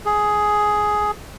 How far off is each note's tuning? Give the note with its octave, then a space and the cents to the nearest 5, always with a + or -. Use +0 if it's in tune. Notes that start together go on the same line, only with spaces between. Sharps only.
G#4 +10